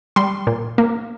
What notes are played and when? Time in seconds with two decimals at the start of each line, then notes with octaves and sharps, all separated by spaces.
0.16 G3 C6
0.47 A#2
0.78 A#3